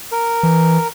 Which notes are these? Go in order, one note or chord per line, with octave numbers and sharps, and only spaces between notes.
A#4
E3